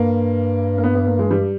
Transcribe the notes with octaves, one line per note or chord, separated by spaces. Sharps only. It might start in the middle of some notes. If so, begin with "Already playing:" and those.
Already playing: G2 A#3
A#3
B3
B3
A#3
G#3
G3